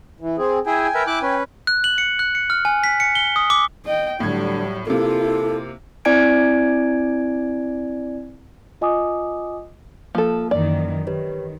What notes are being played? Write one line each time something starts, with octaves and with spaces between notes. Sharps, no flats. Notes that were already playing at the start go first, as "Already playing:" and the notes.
E3
C4 G#4
E4 G#4 G5 G#5
A#4 B4 E5
E4 D6 F#6
C#4 B4
F#6
F#7
C#7
F#6
C#7
F6
G#5
B6
C#7
G7
D#6
D6
D#5 G5
A2 D3 F#3 G3 G#6
C3 A#3 E4 F4 A4
C4 E4 D5 G#5 G#6 D7
F4 D#5 G#5 D6 D#6
F3 A#3 A4
F#2 D#3 E3 D5
D#3 G4 B4 C#5